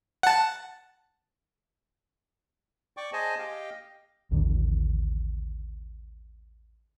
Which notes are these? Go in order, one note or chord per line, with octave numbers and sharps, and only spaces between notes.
F#5 A5
D5 G5 C#6 D6
G#4 C5 D#5 G#5 A5
G4 D#5 F5 G5
A1 D#2 D3